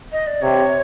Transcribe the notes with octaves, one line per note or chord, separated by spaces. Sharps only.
D#5
D5
C3 C#5